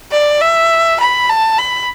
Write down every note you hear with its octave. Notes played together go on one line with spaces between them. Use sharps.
D5
E5
B5
A5
B5